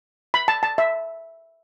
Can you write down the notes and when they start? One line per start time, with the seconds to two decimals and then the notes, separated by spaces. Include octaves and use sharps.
0.34 B5
0.48 A5
0.63 A5
0.78 E5